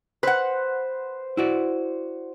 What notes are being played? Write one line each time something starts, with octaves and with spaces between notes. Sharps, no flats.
B4 C5 F#5
E4 F#4 D5